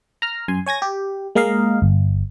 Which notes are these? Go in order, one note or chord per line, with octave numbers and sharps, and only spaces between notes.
A#5 F6
F#2 G#5 C6
C#5 G#5 G#6 A#6
G4
G#3 A#3 A#4 D#5 F5
G1